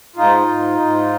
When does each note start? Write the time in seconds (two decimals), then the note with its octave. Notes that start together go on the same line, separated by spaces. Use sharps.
0.16 G#2 D#4 F4
0.48 G#2
0.80 G#2